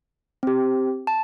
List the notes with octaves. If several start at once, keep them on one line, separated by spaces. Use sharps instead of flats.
C4 G4
A5